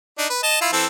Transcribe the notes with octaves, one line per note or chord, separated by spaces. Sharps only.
D4 D#4
B4
D#5 A5
E4 F4
E3 C4 A4